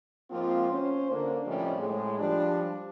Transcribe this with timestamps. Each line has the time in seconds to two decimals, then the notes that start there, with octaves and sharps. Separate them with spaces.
0.30 G#2 F3 A#3 C4 F4
0.71 C#4 C5
1.11 D3 A#3 D4
1.46 A2 C3 F3 G3 C#4 D#5
1.78 A2 G#3
2.19 F3 G3 D4